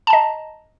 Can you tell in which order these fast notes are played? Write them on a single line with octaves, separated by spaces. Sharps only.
A5 A#5 D#5